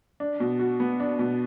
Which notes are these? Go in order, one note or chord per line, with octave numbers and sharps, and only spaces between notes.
D4
B2
F#4
B3
D4
B2